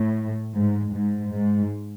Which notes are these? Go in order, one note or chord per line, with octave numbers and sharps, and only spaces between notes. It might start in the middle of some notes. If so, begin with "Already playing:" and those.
Already playing: A2
G#2
G#2
G#2